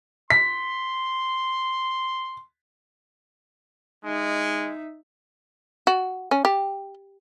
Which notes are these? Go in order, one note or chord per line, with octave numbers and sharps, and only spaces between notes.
C6 B6
G#3 D#4 E5
F#4
C#4
G4